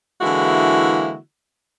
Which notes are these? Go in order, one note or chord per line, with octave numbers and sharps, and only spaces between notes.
D3 E3 G#3 A#3 E4 F#4